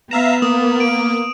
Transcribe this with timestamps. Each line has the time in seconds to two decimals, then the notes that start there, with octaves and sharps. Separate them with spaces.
0.11 B3 E5 F5 A#5 E7
0.42 A#3 D#6
0.80 D7